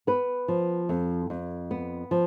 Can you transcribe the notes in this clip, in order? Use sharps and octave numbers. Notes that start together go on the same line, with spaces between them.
B3 B4
F3
F2
F2
B3
F3